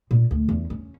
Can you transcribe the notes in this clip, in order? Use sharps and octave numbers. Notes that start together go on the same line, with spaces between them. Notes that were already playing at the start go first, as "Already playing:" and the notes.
A#2
D2
E2
C#4